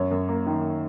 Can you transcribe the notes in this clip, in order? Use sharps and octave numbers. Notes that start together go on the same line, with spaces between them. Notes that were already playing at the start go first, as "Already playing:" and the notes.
Already playing: F#2 C#5
F#2
A#3
D#3